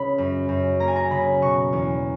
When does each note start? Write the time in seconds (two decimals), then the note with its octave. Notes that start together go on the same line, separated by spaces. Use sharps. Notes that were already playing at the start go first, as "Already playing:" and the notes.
Already playing: C#2 C#3 B5
0.18 F#2
0.49 F#2
0.80 A#3 A#5
0.88 G#5
0.96 A#5
1.11 C#3 B5
1.42 B2 C#6
1.73 E2